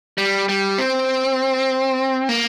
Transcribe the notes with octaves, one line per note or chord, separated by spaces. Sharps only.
G3
G3
C4
A#3